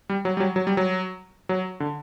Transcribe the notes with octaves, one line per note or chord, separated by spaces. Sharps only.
G3
F#3
G3
F#3
F#3
G3
F#3
F#3
D3